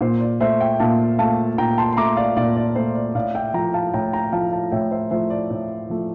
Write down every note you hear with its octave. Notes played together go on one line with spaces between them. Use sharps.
A#2 C5
D5
A3 C5 E5
E5 G5
A#2 F5 A5
A3 F5 A5
A#2 G5 A#5
A5 C6
C6
A3 A#5 D6
D5 F5
A#2 D5 F5
D5
A3 C5
D5
A2 D5 F5
E5 G5
F3 A3 G5 A#5
F5 A5
A2 G5 A#5
G5 A#5
F3 A3 F5 A5
F5 A5
A2 E5 G5
C5 E5
F3 A3 C5 E5
D5
A2
F3 A3